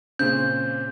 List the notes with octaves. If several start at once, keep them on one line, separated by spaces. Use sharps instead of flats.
A#2 C#3 C4 G6